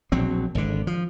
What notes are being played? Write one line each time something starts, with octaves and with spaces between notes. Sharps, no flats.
A#1 B2 F#3 C4
G#1 D3
F3